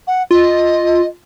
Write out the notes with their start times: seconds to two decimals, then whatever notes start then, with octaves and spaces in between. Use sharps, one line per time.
0.07 F#5
0.31 F4 D#5